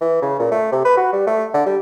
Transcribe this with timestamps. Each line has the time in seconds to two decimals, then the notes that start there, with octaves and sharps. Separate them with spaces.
0.01 E3
0.22 C#3
0.39 A#2
0.51 A3
0.72 C3
0.85 B4
0.97 F#4
1.13 G3
1.27 A3
1.54 D3
1.66 G3